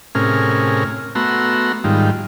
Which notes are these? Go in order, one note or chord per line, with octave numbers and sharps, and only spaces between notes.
A2 C3 C#4 G#4 A#4 F6
A3 B3 F#4 A#5 C6 E6
G#2 D#3 G3 F4